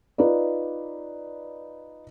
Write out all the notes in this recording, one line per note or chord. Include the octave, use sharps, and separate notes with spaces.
D#4 F4 B4 D5